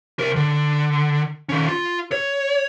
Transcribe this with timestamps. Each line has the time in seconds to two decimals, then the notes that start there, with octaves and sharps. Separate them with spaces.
0.19 C2 A#4
0.36 D3
1.49 D#3 C#4
1.68 F4
2.12 C#5